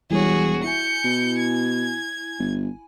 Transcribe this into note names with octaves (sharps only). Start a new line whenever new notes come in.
E1 E3 G3 F#4 G#4 C#5
E4 G#5 G6 C#7
B2
G#6
G1